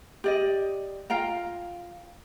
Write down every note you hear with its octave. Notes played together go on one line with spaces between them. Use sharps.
G4 D5 D#5
F4 F5 G5 A#5